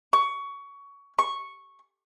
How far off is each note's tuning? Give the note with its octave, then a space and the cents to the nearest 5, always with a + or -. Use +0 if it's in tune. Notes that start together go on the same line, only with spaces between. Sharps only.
C#6 +20
C#6 -5